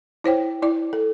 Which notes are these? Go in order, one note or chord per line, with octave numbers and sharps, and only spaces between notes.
E4 C5 C#5 G5
E4 D5
A4